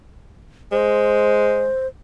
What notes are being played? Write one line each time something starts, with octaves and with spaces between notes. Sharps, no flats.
G#3 C5